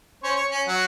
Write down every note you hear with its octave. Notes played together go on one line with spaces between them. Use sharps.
C#4 C5 C#5
C#5
C#4
F#3 F#4